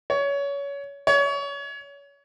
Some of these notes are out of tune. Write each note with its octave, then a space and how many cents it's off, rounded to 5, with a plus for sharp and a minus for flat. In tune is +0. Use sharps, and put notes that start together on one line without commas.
C#5 +25
C#5 +30